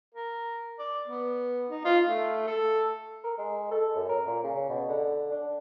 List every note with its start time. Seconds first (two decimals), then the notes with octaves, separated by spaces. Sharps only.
0.15 A#4
0.79 D5
1.08 B3
1.70 D#4
1.85 F4
2.08 A3
2.47 A4
3.24 A#4
3.38 G#3
3.71 A4
3.96 F#2
4.09 A#4
4.27 A#2
4.43 C#3
4.69 B2
4.89 D3
5.31 D4